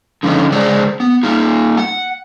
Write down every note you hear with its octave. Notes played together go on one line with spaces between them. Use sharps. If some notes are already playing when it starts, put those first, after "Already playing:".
D3 F3 C#4 D#4
C#3 G#3 G#4 C5 D5
B3
A#3 D#4 F4
F#5